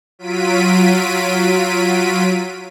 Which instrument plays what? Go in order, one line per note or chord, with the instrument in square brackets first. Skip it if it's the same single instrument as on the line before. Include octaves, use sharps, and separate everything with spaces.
[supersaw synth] F#3 F4 B6 D7 D#7